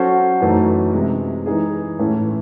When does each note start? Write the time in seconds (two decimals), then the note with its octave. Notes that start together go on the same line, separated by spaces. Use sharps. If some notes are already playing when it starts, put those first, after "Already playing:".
Already playing: F#3 C#4 F#4 A4 C5
0.41 F#2 E3 A3 D#4
0.93 C3 E3 G#3
1.46 E3 G#3 D#4 G#4
1.99 A2 E3 A3 C#4